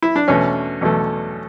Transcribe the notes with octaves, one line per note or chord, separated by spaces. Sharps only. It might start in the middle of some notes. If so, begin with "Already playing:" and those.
E4
D4
E2 B2 A3 C#4
E2 B2 A3